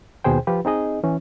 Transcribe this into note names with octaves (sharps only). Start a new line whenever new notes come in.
D#2 B2 G#4 C5 G5
F3 F4 G4 B4
C4 D#4 G#4 D#5
E3 C#4